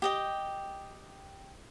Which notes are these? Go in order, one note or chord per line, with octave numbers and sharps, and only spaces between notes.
G4 D#5 G5